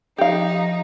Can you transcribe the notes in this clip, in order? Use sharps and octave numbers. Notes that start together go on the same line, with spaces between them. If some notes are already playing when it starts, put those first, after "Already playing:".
F3 D#4 G4 F5